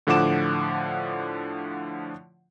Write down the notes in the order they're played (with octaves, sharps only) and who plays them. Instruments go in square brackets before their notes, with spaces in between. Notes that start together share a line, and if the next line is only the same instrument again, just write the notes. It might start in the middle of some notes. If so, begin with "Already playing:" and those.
[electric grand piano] A2 D3 F3 F#5 D6 E7